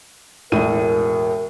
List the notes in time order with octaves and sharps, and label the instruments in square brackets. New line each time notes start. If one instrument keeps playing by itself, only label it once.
[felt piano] E1 A2 D#7 [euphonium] A#4